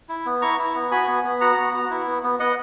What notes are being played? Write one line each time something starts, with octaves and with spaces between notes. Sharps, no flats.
E4
B3
E4 A#5 C#6
E4
B3
F#4 G#5 B5
B3
B3
F#4 F#5 A#5
B3
F#4
E4
B3
B3
B3 D#5 F#5